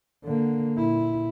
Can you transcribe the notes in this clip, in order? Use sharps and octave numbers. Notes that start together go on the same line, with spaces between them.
D3 A#3
A#2 E4